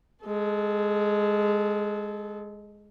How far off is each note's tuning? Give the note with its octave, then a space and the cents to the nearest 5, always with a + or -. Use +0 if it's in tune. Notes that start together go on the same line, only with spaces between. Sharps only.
G#3 +0 A4 -25